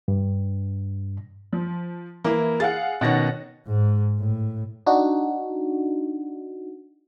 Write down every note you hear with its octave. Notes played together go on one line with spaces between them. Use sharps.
G2
F3
E3 A#3 E4
G#4 F5 F#5 A6
B2 D#3 C#4 F#5 A6 A#6
G#2
A2
D4 D#4 F#4